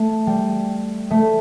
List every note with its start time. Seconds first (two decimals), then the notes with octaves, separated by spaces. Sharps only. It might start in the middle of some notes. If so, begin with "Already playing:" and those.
Already playing: A3
0.27 G3
1.11 A3